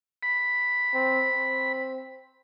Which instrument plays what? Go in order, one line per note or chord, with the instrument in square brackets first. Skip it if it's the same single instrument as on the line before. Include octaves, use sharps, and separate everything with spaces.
[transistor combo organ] B5
[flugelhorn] C4
C4